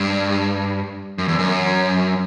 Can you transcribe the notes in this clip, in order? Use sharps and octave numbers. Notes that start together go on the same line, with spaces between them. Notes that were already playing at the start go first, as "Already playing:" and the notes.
Already playing: G2
F#2
E2
F#2